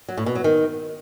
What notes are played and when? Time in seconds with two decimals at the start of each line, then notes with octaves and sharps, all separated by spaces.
0.09 F#3
0.17 A2
0.26 B2
0.35 F#3
0.44 D#3